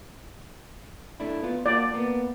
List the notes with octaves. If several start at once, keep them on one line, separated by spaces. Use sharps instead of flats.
A3 D4 E4
B3 F4
A#3 F4 F#4 D5
A#3 B3